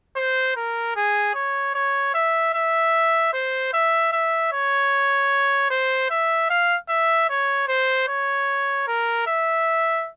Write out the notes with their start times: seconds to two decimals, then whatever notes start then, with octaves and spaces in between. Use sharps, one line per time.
0.16 C5
0.56 A#4
0.96 G#4
1.35 C#5
1.75 C#5
2.14 E5
2.54 E5
3.33 C5
3.73 E5
4.12 E5
4.52 C#5
5.71 C5
6.10 E5
6.50 F5
6.89 E5
7.29 C#5
7.68 C5
8.08 C#5
8.87 A#4
9.27 E5